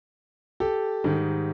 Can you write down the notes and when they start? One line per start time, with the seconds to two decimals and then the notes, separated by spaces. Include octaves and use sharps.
0.60 G4 A4
1.04 G#2 D#3 G3